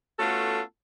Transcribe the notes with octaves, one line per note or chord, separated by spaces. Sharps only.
A3 B3 C#4 F4 F#4 A4